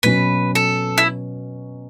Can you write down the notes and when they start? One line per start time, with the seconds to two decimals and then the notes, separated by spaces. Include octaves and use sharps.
0.03 B2 F#3 C#4 B4
0.55 A4
0.98 E4